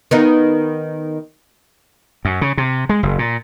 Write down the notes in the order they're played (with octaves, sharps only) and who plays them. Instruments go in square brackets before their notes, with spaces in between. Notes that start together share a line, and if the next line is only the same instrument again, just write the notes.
[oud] D#3 B3 D#4
[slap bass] F#2
C#3
C3
G#3
F#1
A#2